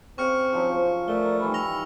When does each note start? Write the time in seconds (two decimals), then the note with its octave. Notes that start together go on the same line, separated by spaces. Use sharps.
0.18 C#3 C4 C#6 F6 C#7
0.53 F3 F#3 C#4 C5
1.08 A3 A#4 D5 G7
1.40 D#3 E3 G3 B5
1.54 E6 A#6 F7